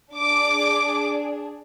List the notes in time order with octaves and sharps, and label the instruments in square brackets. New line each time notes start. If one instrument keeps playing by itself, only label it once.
[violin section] D4 G#4 D6